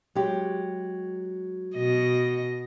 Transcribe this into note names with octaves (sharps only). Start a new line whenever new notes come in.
F#3 G#3 G4
B2 D#5